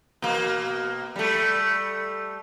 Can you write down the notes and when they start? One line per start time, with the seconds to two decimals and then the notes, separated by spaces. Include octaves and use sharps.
0.22 B2 A#3
1.16 G3 A3